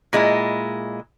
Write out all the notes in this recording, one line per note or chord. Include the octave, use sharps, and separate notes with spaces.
A#2 G#3 E4